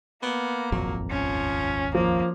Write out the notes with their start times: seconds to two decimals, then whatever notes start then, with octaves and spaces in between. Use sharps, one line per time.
0.23 A#3 B3
0.72 D#1 G#1 F2 F#3
1.11 F3 C#4
1.95 F3 A#3